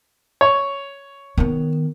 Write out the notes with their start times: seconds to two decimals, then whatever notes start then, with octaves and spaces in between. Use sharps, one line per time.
0.41 C#5
1.38 D#3 B3